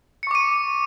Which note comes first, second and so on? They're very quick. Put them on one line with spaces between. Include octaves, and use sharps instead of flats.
C#7 C#6 D6 D#7